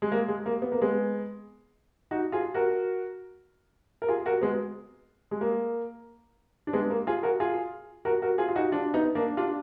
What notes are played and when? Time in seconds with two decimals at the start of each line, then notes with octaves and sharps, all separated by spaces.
0.02 G#3
0.12 A#3
0.28 G#3
0.46 A#3
0.62 B3
0.72 A#3
0.82 G#3 B3
2.11 D#4 F#4
2.32 F4 G#4
2.54 F#4 A#4
4.02 A#4
4.08 F4 G#4
4.26 F#4 A#4
4.41 G#3 B3
5.31 G#3
5.41 A#3
6.67 D4
6.73 G#3 B3
6.90 A#3
7.07 F4 G#4
7.23 F#4 A#4
7.40 F4 G#4
8.05 F#4 A#4
8.22 F#4 A#4
8.38 F4 G#4
8.48 F4
8.56 D#4 F#4
8.72 D4 F4
8.94 B3 D#4
9.15 A#3 D4
9.37 D4 F4